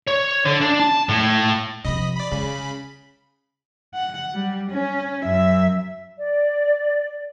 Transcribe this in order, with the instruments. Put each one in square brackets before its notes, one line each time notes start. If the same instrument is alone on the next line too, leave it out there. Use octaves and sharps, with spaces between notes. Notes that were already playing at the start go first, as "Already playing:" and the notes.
[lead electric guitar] C#5
D3
D4
A5
A2
[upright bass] C3 F3 [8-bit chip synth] D#5 B5
[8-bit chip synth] D5 B5
[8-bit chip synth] C#3 B5 [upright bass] G#3
[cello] F#5
G3
C#4
F#2 E5
[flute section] D5